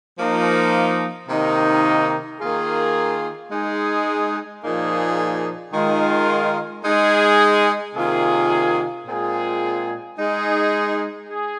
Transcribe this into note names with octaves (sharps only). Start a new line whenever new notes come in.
F3 A#3 D#4
C3 D#3 A#3 D#4
D#3 A#3 F4 G#4
G#3 D#4 G#4
A#2 F3 A#3 D#4 G#4
D#3 G#3 F4
G#3 D#4 G#4
C3 D#3 A#3 F4 G#4
A#2 G#3 C4 F4 G#4
G#3 D#4 G#4
G#4